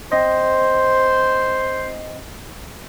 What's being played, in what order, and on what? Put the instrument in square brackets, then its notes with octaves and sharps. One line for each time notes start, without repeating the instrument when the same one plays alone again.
[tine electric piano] C4 D#5 [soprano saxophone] C5